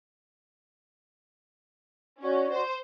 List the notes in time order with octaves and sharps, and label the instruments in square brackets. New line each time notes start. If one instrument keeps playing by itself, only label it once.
[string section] C#4 [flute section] F#4 C#5 D5
[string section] C5